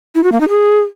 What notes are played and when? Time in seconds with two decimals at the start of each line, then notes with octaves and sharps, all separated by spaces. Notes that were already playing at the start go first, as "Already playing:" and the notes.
0.15 E4
0.24 F#4
0.32 A#3
0.41 D#4
0.49 G#4